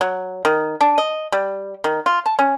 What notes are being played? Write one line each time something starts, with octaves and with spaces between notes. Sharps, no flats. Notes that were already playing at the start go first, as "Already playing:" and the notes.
F#3
D#3
D4
D#5
G3
D#3
F4
A5
C#4